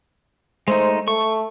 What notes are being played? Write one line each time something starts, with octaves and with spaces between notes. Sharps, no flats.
G#3 A3 D#4 C5
A3 C#6